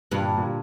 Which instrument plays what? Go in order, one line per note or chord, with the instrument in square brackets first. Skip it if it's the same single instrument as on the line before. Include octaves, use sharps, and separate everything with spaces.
[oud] G2 [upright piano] A#2 D3
[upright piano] A#2 D3